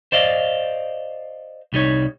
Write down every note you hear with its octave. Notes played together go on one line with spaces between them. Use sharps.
C5 D5 D#5 F5
C2 G3 D#4 C#5